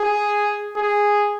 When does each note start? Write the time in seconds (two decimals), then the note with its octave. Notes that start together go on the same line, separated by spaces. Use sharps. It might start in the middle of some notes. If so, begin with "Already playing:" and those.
Already playing: G#4
0.76 G#4